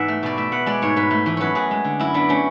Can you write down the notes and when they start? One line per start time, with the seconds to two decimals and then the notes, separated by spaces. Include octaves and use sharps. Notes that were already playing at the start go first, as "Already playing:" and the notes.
Already playing: G#2 E3 B3 D5 E5 F#5
0.08 A3
0.23 B2 D5
0.37 A3 E5
0.52 B3 F#5
0.66 G#3 D5
0.82 G#2 C#5
0.96 G#2 B4
1.11 A3
1.26 E3
1.37 F#2 B4 C#5
1.55 F#2 G#4
1.71 G#3
1.84 D3
1.99 F#2 E4
2.14 B3 D4
2.29 A3 C#4